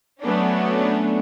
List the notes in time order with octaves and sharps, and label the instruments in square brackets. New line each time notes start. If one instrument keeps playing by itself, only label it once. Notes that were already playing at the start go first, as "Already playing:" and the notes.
[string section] F#3 A3 B3 C#4 D4